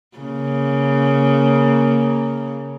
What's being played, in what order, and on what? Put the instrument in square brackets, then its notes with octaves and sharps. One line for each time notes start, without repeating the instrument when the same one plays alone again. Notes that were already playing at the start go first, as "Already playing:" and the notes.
[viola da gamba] C#3 A#3